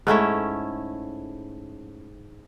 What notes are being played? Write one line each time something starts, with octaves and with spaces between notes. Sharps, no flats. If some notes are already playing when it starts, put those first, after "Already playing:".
G#2 A3 C#4 E4